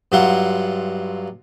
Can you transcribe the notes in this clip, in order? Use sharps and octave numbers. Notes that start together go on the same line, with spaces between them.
G2 F#3 E4 F4 F#5 C6